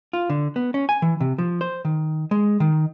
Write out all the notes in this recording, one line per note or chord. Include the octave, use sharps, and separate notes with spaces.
F4
D3
B3
C#4
G#5
E3
C3
F3
C5
D#3
G#3
D#3